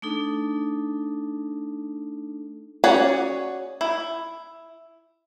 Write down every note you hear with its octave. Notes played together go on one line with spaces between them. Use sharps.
A3 D4 D#4 A4
C#4 F#4 G#4 C#5 D5
E4